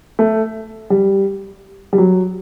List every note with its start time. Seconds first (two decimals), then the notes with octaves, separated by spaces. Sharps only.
0.19 A3
0.90 G3
1.93 G3
1.98 F#3